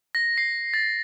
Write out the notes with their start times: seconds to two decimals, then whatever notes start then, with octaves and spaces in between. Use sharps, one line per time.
0.15 A#6
0.38 C7
0.74 A6